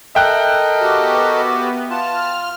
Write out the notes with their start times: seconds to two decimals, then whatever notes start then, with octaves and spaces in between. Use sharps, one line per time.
0.15 A4 A#4 D#5 E5 G5 F#6
0.81 B3 F#4 G4
1.90 F4 A5 F6